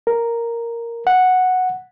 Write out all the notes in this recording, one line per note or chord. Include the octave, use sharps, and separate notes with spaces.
A#4
F#5